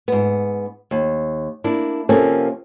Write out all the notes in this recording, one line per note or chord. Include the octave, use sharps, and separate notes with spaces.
G#2 B3
D#2
A#3 D4 E4
C3 F3 A#3 C4 C#4 A4